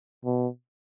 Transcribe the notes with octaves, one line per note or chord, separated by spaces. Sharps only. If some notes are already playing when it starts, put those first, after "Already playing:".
B2